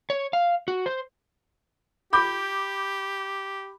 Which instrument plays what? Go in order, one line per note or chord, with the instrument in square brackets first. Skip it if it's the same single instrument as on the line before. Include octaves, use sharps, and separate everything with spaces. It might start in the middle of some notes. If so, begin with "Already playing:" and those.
[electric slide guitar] C#5
F5
F#4
C5
[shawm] G4 [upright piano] B5 D6 G6